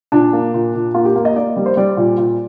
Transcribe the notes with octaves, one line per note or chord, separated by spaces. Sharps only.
A#2 D4
A#3
A#2
A#2
A#3 F4
G4
A#3 A#4
D#5
A#3 D5
G3
C5
G3 D5
A#2
A#2